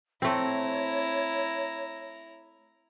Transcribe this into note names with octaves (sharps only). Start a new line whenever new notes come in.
A3 C4 E4 C#5 A#5